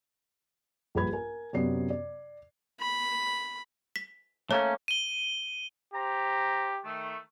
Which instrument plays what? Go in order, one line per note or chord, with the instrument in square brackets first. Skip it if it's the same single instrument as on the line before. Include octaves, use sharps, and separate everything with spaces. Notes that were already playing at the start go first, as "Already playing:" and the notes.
[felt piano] A#1 G2 G#4 B4 B5 G#6
A#4 G#5
F#2 C3 B3 D5 C7
D5
[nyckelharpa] B5
[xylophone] B6
[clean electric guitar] A3 A#3 C#4 [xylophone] C#5
[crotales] D#7 G7
[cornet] G4 [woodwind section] C5 A#5
[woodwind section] D#3 A3